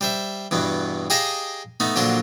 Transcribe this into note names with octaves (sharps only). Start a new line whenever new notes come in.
G3 C5 E5
E2 G2 B2 B3
G4 G#4 D#5 F5 A5 A#5
A3 B3 D#4
A#1 D3 F#3 A#3 F4 C6